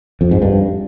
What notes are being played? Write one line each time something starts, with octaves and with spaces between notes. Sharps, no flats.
F2
G#2
G2